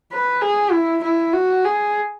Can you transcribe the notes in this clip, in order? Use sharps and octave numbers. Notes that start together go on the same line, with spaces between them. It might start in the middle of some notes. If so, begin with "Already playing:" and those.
B4
G#4
E4
E4
F#4
G#4